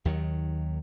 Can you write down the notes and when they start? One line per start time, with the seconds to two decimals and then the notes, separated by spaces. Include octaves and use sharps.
0.05 D#2 D#3 F#3